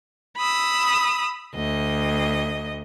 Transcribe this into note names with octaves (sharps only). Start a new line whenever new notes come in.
B5 D#6 E6
D2 D#5